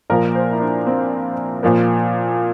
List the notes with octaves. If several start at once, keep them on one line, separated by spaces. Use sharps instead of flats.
A#2 F3 A#3 A#4
C5
E4
D4
C4
A#2 F3 A#3